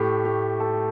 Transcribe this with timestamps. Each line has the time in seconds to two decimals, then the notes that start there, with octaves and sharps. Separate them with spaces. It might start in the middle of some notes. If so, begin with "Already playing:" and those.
Already playing: A2 A3 G4
0.25 G4
0.60 A4